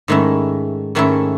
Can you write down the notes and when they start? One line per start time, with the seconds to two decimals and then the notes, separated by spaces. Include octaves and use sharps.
0.08 G#2 D#3 A3 C#4 E4
0.95 G#2 D#3 A3 C#4 E4